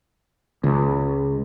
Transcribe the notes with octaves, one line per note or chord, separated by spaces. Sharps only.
C#2